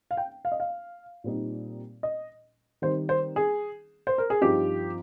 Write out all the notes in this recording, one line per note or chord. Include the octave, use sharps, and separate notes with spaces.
F5
G5
F5
D#5
F5
A#2 G3 C4 D#4
D#5
D#3 G3 C4 D#4 C5
C5
G#4
C5
A#4
G#4
G2 F3 C4 D#4 G4